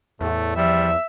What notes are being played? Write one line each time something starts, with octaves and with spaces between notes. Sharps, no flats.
E2 A2 A3
F3 G3 E5